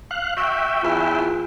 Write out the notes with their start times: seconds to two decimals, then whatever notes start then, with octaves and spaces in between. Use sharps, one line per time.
0.11 F5 F#6
0.37 F#4 E5 G5
0.83 E2 F4